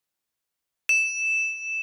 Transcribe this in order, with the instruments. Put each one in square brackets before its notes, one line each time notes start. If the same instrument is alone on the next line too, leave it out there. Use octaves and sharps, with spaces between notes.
[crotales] E7